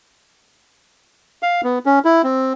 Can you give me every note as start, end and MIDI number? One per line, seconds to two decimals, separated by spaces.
1.43 1.61 77
1.64 1.79 59
1.86 1.99 61
2.05 2.22 64
2.24 2.53 60